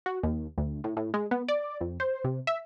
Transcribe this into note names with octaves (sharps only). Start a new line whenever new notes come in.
F#4
D#2
D2
A2
A2
G#3
B3
D5
F2
C5
C3
E5